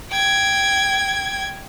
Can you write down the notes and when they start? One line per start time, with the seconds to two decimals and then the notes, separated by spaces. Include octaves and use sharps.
0.11 G5 G#6